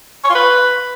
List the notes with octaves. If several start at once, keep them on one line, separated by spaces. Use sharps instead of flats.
C#5
F4
B4